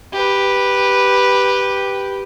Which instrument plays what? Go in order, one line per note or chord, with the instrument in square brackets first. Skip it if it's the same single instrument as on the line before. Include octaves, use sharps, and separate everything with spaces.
[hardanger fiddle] G4 B4